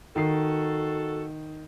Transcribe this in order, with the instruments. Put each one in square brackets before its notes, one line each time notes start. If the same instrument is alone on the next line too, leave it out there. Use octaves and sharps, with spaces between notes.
[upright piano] D#3 C7 [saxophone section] F#4 A4